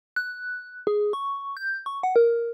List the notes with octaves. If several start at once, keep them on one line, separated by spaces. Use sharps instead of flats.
F#6
G#4
C#6
G6
C#6
F#5
A#4